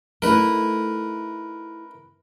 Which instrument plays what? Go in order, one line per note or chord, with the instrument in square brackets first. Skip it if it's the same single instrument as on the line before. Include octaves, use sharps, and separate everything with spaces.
[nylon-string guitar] A3 D#4 E4 [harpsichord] A#4 B4